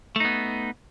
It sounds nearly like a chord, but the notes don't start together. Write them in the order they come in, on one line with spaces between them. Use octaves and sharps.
A3 D#4 B3